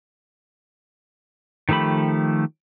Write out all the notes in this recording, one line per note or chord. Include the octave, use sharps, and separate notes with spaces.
D#3 F3 A3 G4 B5